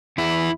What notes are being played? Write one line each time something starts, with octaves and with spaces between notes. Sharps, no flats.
E2 E4